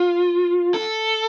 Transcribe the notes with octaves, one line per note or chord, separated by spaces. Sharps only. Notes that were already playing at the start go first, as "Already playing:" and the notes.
Already playing: F4
A4